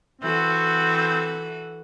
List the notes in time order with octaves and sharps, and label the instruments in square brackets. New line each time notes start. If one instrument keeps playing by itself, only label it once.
[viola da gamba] E3 F#4 A4 [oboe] C4